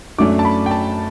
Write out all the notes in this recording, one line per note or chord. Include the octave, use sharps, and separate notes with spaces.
F#2 F#3 A3 D4 D6
A5
B5
G5
A5